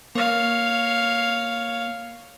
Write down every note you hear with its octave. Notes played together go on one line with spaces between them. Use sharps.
A#3 C#5 F5